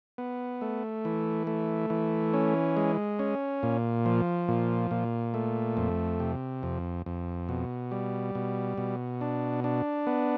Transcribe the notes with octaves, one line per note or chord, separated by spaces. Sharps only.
B3
A3
E3
A3
E3
C#4
G#3
C#4
A#2
F3
A#2
A#2
A3
F2
C3
F2
F2
B2
G3
B2
B2
D4
D4
B3